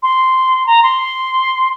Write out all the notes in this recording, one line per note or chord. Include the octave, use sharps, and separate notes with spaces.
C6
A#5
C6